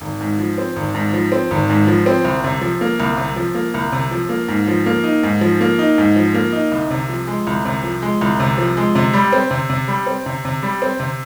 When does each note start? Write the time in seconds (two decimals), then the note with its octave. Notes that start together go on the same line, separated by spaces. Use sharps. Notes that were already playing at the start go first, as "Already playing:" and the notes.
0.01 G#1
0.21 G#2
0.39 F3
0.58 C4
0.76 G#1
0.95 G#2
1.13 F3
1.32 C4
1.51 G#1
1.70 G#2
1.87 F3
2.06 C4
2.25 C2
2.44 C3
2.61 F3
2.81 A#3
3.00 C2
3.17 C3
3.36 F3
3.55 A#3
3.74 C2
3.92 C3
4.11 F3
4.29 A#3
4.48 G#2
4.67 F3
4.86 A#3
5.04 D#4
5.23 G#2
5.41 F3
5.61 A#3
5.79 D#4
5.98 G#2
6.16 F3
6.34 A#3
6.53 D#4
6.72 C2
6.91 C3
7.09 F3
7.27 G#3
7.47 C2
7.65 C3
7.83 F3
8.02 G#3
8.21 C2
8.40 C3
8.58 F3
8.77 G#3
8.95 C3
9.13 G3
9.33 C4
9.51 C3
9.70 C3
9.88 G3
10.06 C4
10.26 C3
10.45 C3
10.63 G3
10.82 C4
11.00 C3